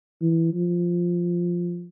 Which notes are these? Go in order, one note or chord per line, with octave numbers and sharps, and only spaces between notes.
E3
F3